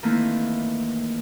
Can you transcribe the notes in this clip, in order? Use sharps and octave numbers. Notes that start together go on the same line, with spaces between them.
D#3 E3 A3 A#3 C4 E4